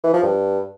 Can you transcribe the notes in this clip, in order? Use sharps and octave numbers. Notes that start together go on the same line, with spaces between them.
E3
F3
G2